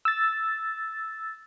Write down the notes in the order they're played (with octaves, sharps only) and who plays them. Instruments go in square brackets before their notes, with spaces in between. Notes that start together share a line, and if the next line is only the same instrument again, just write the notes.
[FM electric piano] E6 A6